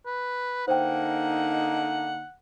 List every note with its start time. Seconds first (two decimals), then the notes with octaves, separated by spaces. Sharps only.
0.06 B4
0.68 D3 A#3 D#4 C5 F#5 G5